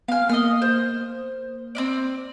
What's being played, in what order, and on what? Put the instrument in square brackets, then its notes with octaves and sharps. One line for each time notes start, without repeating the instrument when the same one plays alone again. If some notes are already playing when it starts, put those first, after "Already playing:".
[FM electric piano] B3 G#5 [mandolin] F5 F6
[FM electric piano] A#3 [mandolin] D#5 D#6 F6
[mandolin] C5
C4 C#4 D5